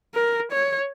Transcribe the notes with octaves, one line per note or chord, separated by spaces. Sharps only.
A#4
C#5